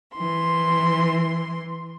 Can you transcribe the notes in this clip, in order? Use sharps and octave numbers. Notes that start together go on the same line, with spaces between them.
E3 C6